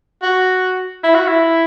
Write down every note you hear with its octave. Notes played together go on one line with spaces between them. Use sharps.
F#4
E4
F#4
E4